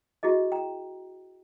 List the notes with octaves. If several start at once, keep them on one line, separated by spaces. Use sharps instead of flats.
E4 F#4 G#4 D#5
G5 A#5